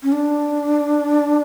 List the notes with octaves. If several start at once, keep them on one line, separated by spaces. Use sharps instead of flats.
C#4
D4